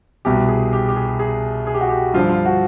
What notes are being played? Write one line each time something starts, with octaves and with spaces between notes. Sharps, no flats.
C2 B2 G4
G#4
G4
G4
G#4
G#4
G#4
G4
F#4
G4
G2 D3 F3 F4
F4
F#4